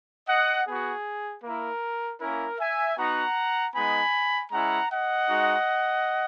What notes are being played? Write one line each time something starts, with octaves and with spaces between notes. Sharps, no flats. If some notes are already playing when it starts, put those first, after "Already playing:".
D#5 F#5
B3 F#4 G#4
A#3 E4 A#4
A#3 C#4 E4 A#4
E5 G#5
B3 D#4 F#4 F#5 A#5
G#3 B3 D#4 G#5 B5
G#3 C#4 E4 F#5 A#5
D#5 F#5
G#3 D#4 F#4